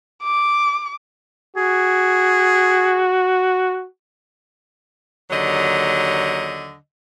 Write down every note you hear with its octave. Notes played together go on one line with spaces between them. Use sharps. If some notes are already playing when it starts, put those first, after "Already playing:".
D6
F#4 G#4
D#2 D3 F#3 D#5